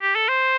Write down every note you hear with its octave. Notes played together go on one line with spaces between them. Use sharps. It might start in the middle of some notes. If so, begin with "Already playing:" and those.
G4
A4
C5